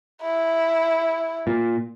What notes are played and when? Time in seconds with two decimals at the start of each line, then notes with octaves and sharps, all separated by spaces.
0.22 E4
1.47 A#2